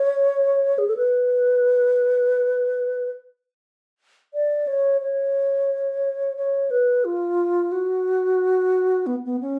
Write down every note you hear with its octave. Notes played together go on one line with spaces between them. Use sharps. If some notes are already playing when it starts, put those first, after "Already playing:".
Already playing: C#5
G#4
A4
B4
D5
C#5
C#5
C#5
B4
F4
F#4
B3
B3
C#4